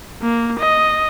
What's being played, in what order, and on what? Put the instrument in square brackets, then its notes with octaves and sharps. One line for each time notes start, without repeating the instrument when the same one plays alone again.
[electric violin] A#3
D#5